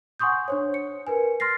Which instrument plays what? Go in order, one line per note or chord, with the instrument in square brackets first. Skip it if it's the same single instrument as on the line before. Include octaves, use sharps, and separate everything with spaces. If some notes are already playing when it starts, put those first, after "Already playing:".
[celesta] F#5 G#5 C6 C#6 D#6 G6
D4 C5 C#5
C#7
A#4 B4 G#5
C6 F6 A6 A#6 C7